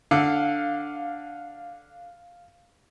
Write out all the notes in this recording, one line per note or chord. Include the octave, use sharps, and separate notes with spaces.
D3 F5